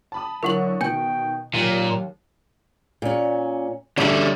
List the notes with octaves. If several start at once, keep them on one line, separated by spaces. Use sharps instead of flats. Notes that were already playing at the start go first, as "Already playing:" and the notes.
A5 B5 D#6
D3 F#3 E4 A#4 F#5 C#6 F#7
B2 D#3 G5 G#5 G6
D#2 A#2 F#3
A#2 C#4
D3 G3 A3 C#4 E5